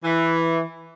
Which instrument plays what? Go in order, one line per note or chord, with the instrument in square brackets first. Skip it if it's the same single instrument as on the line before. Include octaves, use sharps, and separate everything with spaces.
[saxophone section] E3